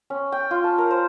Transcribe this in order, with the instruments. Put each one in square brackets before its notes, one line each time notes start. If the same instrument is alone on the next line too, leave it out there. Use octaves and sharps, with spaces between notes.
[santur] C#4
G5
F4
A5
A#4
C5